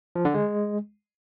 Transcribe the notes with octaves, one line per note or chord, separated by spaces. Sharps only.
F3
D3
G#3